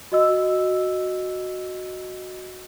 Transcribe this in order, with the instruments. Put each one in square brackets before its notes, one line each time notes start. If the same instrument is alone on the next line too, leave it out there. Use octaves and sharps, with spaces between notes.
[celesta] F#4 D#5 E6